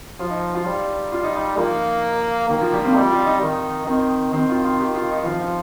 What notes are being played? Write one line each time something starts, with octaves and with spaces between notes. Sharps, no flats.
F3 F4
D#4
F4
G3
F4
D#4
D#4
F3 A#3
D#3 A#3
F3
G3
C4
G3 D#4
F4
D#4
D#3
D#3 C4
D#3 C4
F4
F4
G4
F4
D#4
F3 F4
F4